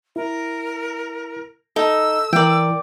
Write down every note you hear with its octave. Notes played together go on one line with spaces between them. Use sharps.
E4 A#4
D#4 A4 E6
E3 A#4 D5 G5